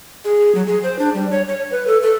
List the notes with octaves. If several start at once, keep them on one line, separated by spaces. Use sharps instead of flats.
G#4
F#3
G#4
C5
D4
G3
C#5
C#5
B4
A4
A4